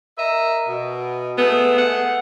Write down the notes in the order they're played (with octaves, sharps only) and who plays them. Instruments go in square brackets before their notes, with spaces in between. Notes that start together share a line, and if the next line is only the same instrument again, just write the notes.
[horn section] A#4 D#5 E5
B2
[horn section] G#3 A3 G#4 [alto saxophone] B3
[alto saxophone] F#5